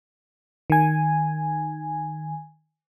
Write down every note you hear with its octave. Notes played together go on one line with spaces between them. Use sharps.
D#3 G#5